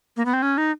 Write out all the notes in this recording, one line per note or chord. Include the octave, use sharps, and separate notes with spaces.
A#3
B3
C4
C#4
D#4